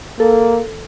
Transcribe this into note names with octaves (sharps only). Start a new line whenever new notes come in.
A#3 A4